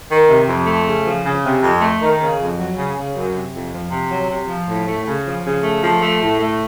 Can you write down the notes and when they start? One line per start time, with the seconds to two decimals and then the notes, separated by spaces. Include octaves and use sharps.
0.10 D#3
0.28 C3
0.48 F2
0.66 A3
0.85 C#3
1.05 F3
1.24 C#3
1.43 C3
1.62 F2
1.81 A3
2.01 D#3
2.19 C#3
2.38 F2
2.57 F#3
2.76 C#3
2.95 C#3
3.14 F#2
3.34 C3
3.53 F2
3.72 F3
3.91 C3
4.10 F#3
4.29 C3
4.48 F3
4.67 A2
4.86 A3
5.06 C#3
5.25 F3
5.43 C#3
5.63 A3
5.82 F3
6.01 A3
6.20 A2
6.39 A3